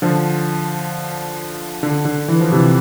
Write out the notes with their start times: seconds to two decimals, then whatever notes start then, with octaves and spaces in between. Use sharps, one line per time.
0.02 D3 F3
1.83 D3
2.05 D3
2.28 E3
2.40 F3
2.52 C3 E3